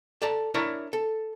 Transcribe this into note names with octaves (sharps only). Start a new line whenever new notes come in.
A4 D5 A5 A#5
D4 E4 A#4 C#5 D5 A#5
A4